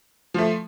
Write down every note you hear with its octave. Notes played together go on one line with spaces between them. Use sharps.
F3 A3